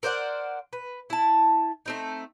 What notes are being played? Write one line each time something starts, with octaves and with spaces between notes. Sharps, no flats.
A#4 C5 D5 F#5
B4
E4 A5
A3 C4 D#4